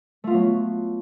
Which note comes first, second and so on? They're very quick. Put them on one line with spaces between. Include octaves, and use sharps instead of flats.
A3 F4 B3 F#3